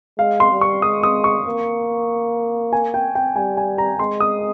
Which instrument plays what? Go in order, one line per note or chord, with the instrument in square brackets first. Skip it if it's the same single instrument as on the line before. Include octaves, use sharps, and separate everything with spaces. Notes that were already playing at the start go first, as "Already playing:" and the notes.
[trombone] G#3 [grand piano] F5
[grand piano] C6
[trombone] G3
[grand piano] C#6
[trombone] G#3 [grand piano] D#6
[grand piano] D#6
C#6
[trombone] A#3
[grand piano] G#5
G5
G5
[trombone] G3 [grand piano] G#5
[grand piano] G#5
A#5
[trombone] G#3 [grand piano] C6
[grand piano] D#6